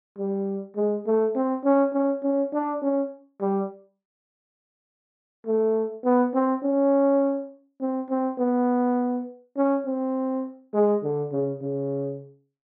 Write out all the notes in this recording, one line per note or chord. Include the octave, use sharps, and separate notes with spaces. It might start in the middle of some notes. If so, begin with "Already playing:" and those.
G3
G#3
A3
C4
C#4
C#4
C#4
D4
C#4
G3
A3
B3
C4
C#4
C4
C4
B3
C#4
C4
G#3
D3
C#3
C#3